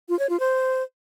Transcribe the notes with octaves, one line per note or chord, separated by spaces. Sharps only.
F4
C#5
F4
C5